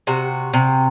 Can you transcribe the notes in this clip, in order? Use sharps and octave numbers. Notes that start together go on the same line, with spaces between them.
C3 F#4
C3